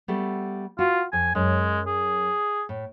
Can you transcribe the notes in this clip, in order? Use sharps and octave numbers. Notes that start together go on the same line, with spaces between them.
G3 A3 B3
F4 F#4
F2 G#5
F#2 G#3
G#4
A2